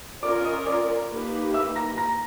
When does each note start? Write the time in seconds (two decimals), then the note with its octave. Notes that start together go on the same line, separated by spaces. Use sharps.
0.23 C#4 F4 A#4 D5 D6
0.44 D#5 D#6
0.66 D5 D6
1.10 A#3 D#4 G4 B4
1.53 E5 E6
1.75 A#5 A#6
1.97 A#5 A#6